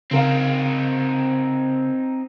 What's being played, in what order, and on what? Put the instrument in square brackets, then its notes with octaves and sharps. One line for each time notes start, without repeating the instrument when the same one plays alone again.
[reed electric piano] C#3 A#4 F5 [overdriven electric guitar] C4 D#4